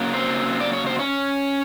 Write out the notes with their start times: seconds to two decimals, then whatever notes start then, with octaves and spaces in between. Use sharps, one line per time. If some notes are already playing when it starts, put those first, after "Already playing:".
Already playing: C#3 F#3 A#3
0.13 C4 C5
0.60 D5
0.73 C#5
0.86 C5
0.99 C#4 C#5